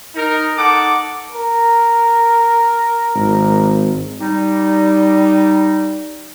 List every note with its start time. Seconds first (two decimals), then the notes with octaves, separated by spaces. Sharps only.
0.15 D#4 A#4
0.57 D#4 A4 F#5 D6
1.32 A#4
3.15 G#1
4.21 G3 D#4